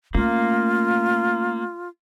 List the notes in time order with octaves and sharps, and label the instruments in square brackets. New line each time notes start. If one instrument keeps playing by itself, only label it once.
[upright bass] A3 C#4 [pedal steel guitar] A#3 [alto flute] F4